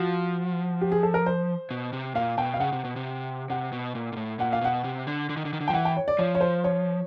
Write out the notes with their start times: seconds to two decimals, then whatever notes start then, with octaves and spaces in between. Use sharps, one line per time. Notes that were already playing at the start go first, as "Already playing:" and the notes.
Already playing: F3 F#4
0.81 G4
0.92 G#4
1.03 A4
1.14 A#4
1.26 C5
1.71 B2
1.93 C3
2.15 A#2 F5
2.38 B2 G5
2.54 F5
2.60 C#3 F#5
2.73 C3
2.85 B2
2.96 C3
3.50 C3 F#5
3.73 B2
3.95 A#2
4.13 A#2
4.17 A2
4.39 A#2 F#5
4.53 F5
4.61 B2 F#5
4.84 C3
5.07 D3
5.29 D3
5.37 D#3
5.45 D3
5.53 D#3
5.61 D3
5.68 G5
5.70 F3
5.74 E3 F#5
5.85 G5
5.97 C#5
6.08 D5
6.19 F3 C#5
6.35 C#5
6.41 C5
6.64 C#5